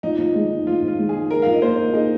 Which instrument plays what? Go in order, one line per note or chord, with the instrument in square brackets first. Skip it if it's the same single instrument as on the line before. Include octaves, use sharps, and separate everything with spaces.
[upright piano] F3 [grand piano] D#4
[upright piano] F3
G#3
D#4
[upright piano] F3 [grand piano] F4
[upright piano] F3 [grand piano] F4
[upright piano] G#3
[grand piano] G#4
[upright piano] D#4
[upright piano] G#4 [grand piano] A#4
[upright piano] F3 [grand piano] F5
[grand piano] D#5
[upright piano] A#3 [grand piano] C5
[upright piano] F4
[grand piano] D#4 [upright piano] G#4